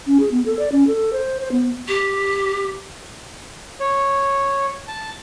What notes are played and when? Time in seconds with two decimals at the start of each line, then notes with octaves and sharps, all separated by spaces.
0.07 C#4
0.20 G#4
0.32 B3
0.46 A4
0.59 D5
0.72 C#4
0.87 A4
1.13 C5
1.40 C5
1.52 B3
1.88 G4
3.80 C#5
4.88 A5